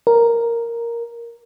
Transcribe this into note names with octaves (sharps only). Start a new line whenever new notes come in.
A#4